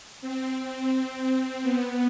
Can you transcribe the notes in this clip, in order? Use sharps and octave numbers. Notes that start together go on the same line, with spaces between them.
C4
B3